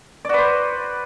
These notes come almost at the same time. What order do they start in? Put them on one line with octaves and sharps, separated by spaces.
D5 F#4 B4 C5